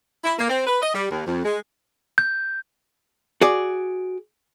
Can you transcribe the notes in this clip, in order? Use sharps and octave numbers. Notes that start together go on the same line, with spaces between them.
E4
A#3
C4
B4
D#5
G3
D#2
F2
G#3
G6
F#4 G#4 D5